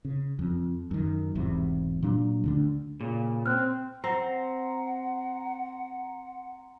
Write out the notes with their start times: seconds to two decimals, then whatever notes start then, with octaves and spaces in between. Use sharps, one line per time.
0.05 C#3
0.39 F2
0.91 F#2 D#3
1.35 E1 E2 G#2 C3
2.03 A#2 F#3 D4
2.44 D2 D3 D4
3.01 A#2 C#3
3.46 C4 F6 F#6
4.04 C4 F#5 A#5 C6